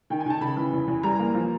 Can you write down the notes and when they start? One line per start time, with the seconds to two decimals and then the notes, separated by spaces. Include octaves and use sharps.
0.10 D#3 G5
0.20 G#5
0.26 D#3 A5
0.41 C#3 B5
0.56 E3
0.73 E2
0.88 E2
1.03 G3 A#5
1.19 A#3
1.34 F3